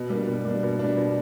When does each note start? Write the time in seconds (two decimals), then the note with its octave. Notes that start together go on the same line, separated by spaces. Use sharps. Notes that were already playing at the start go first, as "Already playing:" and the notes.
Already playing: B2
0.10 G3 A#3 D4
0.27 B2
0.45 G3 A#3 D4
0.63 B2
0.79 G3 A#3 D4
0.97 B2